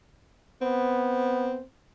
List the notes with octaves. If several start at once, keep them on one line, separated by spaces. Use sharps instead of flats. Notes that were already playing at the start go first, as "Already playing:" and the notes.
B3 C4